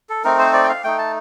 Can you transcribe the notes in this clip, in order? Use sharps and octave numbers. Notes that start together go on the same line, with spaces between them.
A4
A3 C4 D#4 A#4
C5
D5
G5
F5
A3 D#4 G5
A5